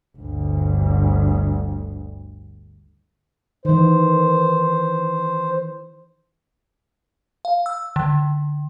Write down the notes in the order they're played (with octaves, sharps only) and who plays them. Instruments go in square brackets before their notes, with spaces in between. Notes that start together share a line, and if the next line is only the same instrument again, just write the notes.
[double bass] G1 D2
[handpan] D#3 E3 [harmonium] C5
[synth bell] F5
E6
D3